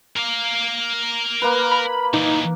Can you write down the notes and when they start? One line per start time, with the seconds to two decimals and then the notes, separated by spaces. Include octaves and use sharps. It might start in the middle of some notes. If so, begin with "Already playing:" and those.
0.16 A#4 F5
1.42 A#3 B4
1.71 B5
2.14 A#2 E3 D#4 D6